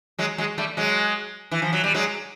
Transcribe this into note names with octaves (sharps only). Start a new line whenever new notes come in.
F#3 G#3
F#3 G#3
G3 A3
F#3 G#3
E3
F3
F#3
G3
F#3 G#3